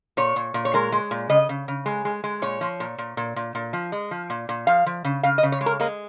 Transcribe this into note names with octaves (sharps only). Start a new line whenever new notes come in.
A#2 C#5
A#2
A#2
C#5
G#3 A#4
G#3
A#2
C#3 D#5
C#3
C#3
G#3
G#3
G#3
A#2 C#5
F3
A#2
A#2
A#2
A#2
A#2
F3
G#3
F3
A#2
A#2
F3 F5
F3
C#3
C#3 F5
D#5
C#3
C#5
G#3
A#4
G#3 A#3